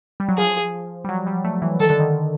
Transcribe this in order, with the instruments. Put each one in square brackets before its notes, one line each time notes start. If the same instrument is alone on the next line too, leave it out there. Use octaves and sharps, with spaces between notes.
[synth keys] G3
F#3
[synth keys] F3 [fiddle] G#4
[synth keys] G3
F#3
G3
A3
E3
[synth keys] D#3 [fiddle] A4
[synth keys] D3
D#3